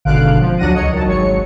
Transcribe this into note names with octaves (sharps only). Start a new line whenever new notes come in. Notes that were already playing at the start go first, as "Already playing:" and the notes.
G#1 B2 D3 F5 F#6 D7
F3
D2 F#3 D4 F#5 A#6 D#7
C#2 C#5 D#5 C#7
D#3 F#3 A5
G#1 F#3 C#5 C#7